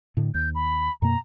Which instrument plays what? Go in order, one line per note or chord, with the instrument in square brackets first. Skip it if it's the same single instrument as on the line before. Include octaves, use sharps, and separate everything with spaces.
[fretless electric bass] A2 D3
[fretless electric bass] D#2 [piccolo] G6
[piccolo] B5
[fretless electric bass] F#2 B2 A#3 [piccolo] A#5